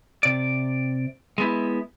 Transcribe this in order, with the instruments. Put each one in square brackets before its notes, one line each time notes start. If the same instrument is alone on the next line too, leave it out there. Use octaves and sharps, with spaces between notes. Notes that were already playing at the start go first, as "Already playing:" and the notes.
[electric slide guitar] C3 D5
G#3 B3 E4